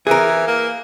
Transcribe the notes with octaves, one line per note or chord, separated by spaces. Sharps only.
E3 G#4 A#4
A#3